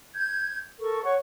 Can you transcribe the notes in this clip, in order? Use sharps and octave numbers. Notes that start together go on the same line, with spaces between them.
G6 G#6
A4 A#4 C#6
C#5 F#5 C#6